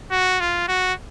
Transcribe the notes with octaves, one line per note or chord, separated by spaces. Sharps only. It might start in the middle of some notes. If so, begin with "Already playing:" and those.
F#4
F4
F#4